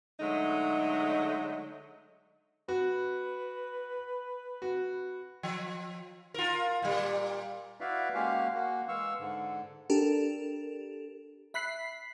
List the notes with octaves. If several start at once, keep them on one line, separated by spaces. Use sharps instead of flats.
D3 F#3 G#3 A3 D#4
F#4 B4
F#4
F3
F4 A#4
A#2 G3
E4 F#4 B4 D5 E5 F5
G#3 A#3 C#4 F#4 G4 F5
A#3 F#4
E3 G#3 F5 C#6 E6
G#2 D3
D4 G4 A4 A#4
E5 B5 F#6 B6 C7